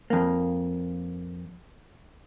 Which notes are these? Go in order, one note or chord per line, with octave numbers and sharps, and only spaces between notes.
F2 A#3